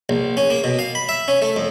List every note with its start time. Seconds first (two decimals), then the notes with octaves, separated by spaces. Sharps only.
0.09 A#1
0.37 C#4
0.50 A#3
0.64 B2
0.79 F5
0.95 B5
1.09 E5
1.28 C#4
1.42 A3
1.56 F2